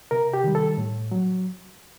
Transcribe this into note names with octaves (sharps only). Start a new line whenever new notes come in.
C3 A#4
G4
D#3 G3
A4
A2
F#3